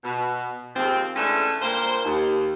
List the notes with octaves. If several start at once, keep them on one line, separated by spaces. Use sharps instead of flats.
B2
D#2 F3 G#3 C4
E3 G#3 A3 C#4 D4
G2 A#2 A#3 C5
D#2